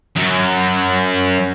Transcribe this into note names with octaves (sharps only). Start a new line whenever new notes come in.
F#2 F#3